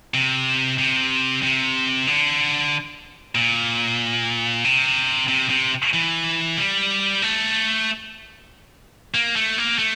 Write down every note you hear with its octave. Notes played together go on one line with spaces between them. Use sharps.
C3
C3
C3
D3
A#2
C3
C3
C3
E3
G3
A3
A#3
A3
A#3
A3